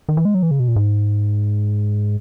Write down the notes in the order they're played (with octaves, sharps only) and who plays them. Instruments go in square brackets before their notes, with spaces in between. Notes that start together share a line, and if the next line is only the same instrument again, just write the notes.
[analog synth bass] D#3
E3
G#3
F#3
E3
C#3
B2
A#2
G#2